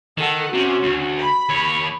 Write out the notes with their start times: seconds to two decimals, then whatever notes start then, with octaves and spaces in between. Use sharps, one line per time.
0.18 D#3 A4 F#5
0.54 C3 C#4 F#4
0.83 D2
1.19 B5
1.49 D#2 C#5